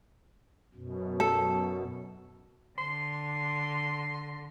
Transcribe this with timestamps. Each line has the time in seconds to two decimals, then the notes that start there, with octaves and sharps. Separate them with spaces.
0.75 F#2 B2
1.20 A4
2.78 D3 C6